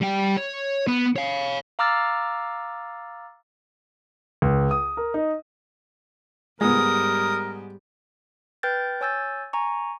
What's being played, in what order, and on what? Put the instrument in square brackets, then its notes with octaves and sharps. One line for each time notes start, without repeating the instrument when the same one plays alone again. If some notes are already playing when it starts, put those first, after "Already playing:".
[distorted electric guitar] G3 G5
C#5
B3
C#5 F5
[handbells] F5 A#5 D6 E6 F6 A6
[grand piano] C#2
D#6
A#4
D#4
[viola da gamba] G#2 G3 [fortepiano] G#3 B3 [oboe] A#4 [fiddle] D#6
[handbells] B4 G5 F6 G6 A6
C#5 G#5 E6 G6 A6
G#5 A#5 C#6